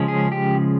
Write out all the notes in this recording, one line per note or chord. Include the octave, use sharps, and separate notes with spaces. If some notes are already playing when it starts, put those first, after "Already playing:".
Already playing: C#3 F3 G#3 C#4
G#4
G4